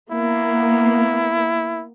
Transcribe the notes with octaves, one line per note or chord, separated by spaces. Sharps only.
A#3 B3 E4